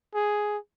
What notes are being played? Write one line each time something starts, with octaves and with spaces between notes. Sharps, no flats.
G#4